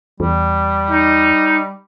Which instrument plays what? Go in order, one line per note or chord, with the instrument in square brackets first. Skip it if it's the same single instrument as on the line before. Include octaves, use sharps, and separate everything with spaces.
[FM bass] E2 [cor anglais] G3
[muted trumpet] D#4